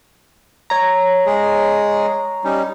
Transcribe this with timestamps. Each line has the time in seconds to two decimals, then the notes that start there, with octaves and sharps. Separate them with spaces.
0.70 C#5 A#5
1.26 G#3 G#4
2.44 G3 C#4 D#4